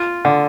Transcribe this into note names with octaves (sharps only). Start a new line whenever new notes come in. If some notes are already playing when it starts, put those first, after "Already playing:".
Already playing: F4
D3